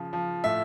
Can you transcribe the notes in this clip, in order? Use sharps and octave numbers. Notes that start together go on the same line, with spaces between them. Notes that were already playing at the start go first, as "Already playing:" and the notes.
Already playing: C#3 F3
F3
A2 E5